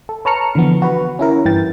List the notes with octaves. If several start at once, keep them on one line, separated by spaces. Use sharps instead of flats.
A4
B4 C#5 A5 A#5 F6 C#7
D3 E3 F3 B3
F#4 B4
C#4 E4 A#4
G2 E3 G5 A6